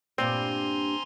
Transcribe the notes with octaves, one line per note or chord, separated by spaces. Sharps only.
G2 A#2 C4 D5 G#5 A#5 C6